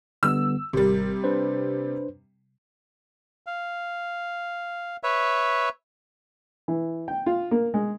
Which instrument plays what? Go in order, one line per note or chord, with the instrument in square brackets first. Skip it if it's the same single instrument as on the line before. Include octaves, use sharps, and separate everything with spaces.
[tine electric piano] D3 G3 B3 [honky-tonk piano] E6
[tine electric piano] G#1 A#4 [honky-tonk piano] C3 G3
[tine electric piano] D4 B4 C5
[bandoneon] F5
B4 C#5 E5
[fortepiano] E3
G5
F4
A#3
G#3